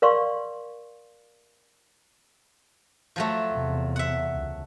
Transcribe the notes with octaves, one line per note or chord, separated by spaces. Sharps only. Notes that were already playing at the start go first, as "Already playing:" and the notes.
A#4 D5 F5 C6 C#6
F3 F#3 A3
E2 C3
E5 F#5
C#2